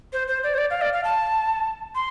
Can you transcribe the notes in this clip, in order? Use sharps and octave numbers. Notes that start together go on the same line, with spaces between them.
C5
C5
D5
C5
D5
F5
D5
F5
A5
C6